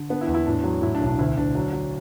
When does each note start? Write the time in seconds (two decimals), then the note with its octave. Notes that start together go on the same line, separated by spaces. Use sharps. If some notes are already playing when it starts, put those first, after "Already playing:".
Already playing: D3
0.09 B3 D4
0.21 E4
0.27 E2
0.34 E4
0.46 A2 D4
0.64 F#3
0.82 A2 E4
0.95 D4
1.01 B1
1.06 D4
1.19 D2 E4
1.37 D2 D4
1.55 F#3
1.73 F#3